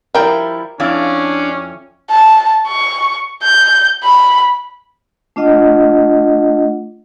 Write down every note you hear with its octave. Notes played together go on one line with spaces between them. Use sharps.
F3 G3 E4 A#4 G5
F2 C#4 D4 E4 F5
A5
C#6
G6
B5
A3 D4 F4 D#5 F#5